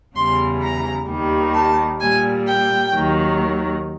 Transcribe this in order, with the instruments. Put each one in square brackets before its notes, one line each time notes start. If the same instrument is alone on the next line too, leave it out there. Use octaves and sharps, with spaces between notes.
[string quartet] E2 C#3 E3 G3 C6
A#5
D#2 D#3 G3
A5
A#2 G3 G#5
G5
D#2 D#3 F#3